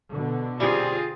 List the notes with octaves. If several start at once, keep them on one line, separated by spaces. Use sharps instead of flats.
B2 D3
G3 C4 F4 G#4